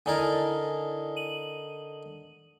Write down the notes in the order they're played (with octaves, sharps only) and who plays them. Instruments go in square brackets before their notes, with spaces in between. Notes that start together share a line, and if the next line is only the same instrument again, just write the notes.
[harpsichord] D3 D#4 A#4 [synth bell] E4 D5 G#5
[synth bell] D#7 F#7